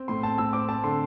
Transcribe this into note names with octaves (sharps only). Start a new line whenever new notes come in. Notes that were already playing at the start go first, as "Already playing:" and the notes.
Already playing: C4
A2 C6
C4 A5
A2 E6
C4 D6
C4 A5
D3 C6